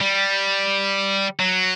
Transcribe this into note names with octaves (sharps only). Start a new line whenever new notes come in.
G3
F#3